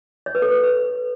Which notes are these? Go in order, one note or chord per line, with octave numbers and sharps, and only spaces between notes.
C#5
B4
A4
B4
B4